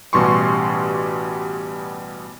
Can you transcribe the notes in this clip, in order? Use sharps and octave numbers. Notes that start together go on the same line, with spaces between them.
A1 B2 G3 G4 C6 C#6